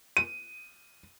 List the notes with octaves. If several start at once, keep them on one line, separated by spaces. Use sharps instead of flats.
D#7